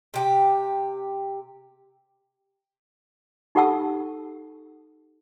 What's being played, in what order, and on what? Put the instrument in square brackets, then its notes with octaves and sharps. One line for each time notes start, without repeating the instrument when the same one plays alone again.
[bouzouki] C3 G4
[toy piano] D#4 G4 A4 F#5 A5 E6